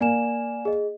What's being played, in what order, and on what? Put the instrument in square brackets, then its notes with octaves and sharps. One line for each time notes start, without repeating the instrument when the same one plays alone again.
[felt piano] A#3 [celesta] D5 G#5 E7
[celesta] G#4 D#5